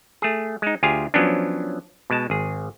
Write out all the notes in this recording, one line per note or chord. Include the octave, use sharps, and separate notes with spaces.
A3 G#4
G#3 D#4
D2 F4 G4 G#4 F5 G#5
F3 F#3 B3 C#4 D4
B2 G#3 A5
G#1 G#4